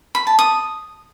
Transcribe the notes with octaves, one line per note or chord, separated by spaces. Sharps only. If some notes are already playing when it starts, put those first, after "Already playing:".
B5
A5
D#6